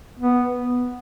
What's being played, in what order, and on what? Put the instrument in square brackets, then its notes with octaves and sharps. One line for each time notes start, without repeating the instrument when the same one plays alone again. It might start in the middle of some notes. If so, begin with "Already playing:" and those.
[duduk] B3